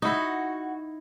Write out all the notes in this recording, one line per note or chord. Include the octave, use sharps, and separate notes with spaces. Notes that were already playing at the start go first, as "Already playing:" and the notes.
D#4 E4 F#4